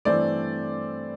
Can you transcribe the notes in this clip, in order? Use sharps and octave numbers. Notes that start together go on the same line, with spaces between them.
G2 E3 A3 C4 C5 D5